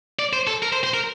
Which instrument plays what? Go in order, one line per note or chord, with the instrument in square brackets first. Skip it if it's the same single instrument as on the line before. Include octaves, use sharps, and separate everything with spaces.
[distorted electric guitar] D5
C5
A4
A#4
C5
C5
A#4